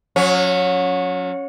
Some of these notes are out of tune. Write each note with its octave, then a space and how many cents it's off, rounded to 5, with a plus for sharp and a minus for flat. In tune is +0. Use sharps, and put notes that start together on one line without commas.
F#3 -35 C#4 +0